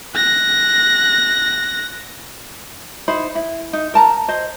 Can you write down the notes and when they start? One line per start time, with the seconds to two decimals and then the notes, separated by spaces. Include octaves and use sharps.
0.16 F#6 A#6
3.08 D#4 E4 C5 B5
3.35 E4
3.73 D#4
3.94 A#4 A5 A#5
4.28 C5 D#5